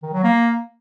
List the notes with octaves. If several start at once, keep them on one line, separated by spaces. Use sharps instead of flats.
D#3
F#3
A#3